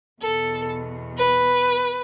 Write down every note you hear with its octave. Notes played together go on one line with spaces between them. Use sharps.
E2 B2 A4
B4